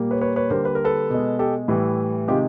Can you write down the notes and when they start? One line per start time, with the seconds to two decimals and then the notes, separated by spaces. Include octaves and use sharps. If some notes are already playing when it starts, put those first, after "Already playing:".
Already playing: A#2 G3 A#3
0.11 B4 C#5
0.21 B4 C#5
0.36 B4 C#5
0.50 D3 G3 A#3 A#4 C5
0.65 B4
0.75 A#4
0.85 A4 B4
1.10 B2 G#3
1.39 G4 A4
1.68 A2 E3 G3
2.28 C3 D#3 G#3 F4 G4